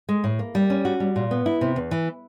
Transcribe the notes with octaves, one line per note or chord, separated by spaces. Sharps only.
G#3
A2
A#3
G3
C#4
F#4
G3
A#2
B3
E4
C3
E2
E3